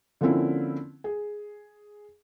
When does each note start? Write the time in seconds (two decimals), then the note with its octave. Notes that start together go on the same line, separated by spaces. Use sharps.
0.21 D3 F3 A#3 C4 C#4 E4
1.04 G#4